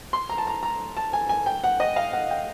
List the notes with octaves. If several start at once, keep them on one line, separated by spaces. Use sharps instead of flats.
C6
A#5
A5
A#5
A#5
A5
G#5
G#5
G5
F#5
D#5
F5
F#5
G5